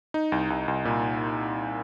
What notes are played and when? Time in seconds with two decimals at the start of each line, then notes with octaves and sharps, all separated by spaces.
0.14 D#4
0.32 C2
0.50 C2
0.68 C2
0.85 A#2